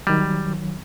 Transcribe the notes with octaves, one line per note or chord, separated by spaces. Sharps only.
D#3 F#3 G3